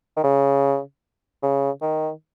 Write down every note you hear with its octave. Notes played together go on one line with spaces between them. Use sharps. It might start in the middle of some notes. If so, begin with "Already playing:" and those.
D#3
C#3
C#3
D#3